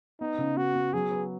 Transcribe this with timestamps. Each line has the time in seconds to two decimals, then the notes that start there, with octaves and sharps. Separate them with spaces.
0.20 B3 D#4
0.38 C#3
0.57 B3 F#4
0.75 B3
0.93 F#3 G#4
1.11 B4